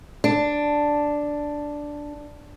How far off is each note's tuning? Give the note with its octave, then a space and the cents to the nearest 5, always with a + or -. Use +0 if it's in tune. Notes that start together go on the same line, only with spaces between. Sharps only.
D4 +0